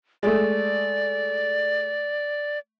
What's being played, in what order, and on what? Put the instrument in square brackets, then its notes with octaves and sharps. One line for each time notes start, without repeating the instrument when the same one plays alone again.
[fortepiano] G#3 A3 [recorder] D5